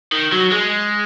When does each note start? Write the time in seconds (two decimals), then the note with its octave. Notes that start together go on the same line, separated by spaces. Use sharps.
0.12 D#3
0.32 F#3
0.52 G#3